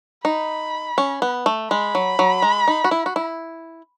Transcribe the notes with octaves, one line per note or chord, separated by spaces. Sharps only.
D#4 B5
C#4
B3
A3
G#3 B5
F#3
F#3
G#3
D#4
F#4
E4
F#4
E4